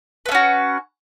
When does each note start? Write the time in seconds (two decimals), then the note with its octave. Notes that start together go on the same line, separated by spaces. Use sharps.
0.26 B4
0.29 A3
0.32 C#4
0.35 F#4